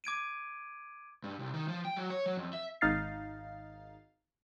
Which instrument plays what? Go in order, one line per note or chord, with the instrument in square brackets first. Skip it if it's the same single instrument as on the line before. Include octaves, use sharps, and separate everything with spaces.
[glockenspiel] D6 G#6 D7 D#7
[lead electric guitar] G2
C2
D#3
F3
G5
F#3
C#5
F#3
F2
E5
[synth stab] G#1 D#4 F5 A6 C7